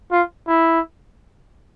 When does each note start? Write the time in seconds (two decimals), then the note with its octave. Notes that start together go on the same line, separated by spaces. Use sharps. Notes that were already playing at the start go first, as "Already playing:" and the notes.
0.11 F4
0.48 E4